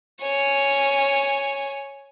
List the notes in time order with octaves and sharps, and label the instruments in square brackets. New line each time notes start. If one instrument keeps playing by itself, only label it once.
[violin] C#5 G#5